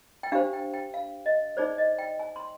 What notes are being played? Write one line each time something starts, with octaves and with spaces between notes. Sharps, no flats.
G5
D4 G4 C5 F5
G5
G5
F5
D#5
D#4 G#4 C5 D5
D#5
G5
G#5
C6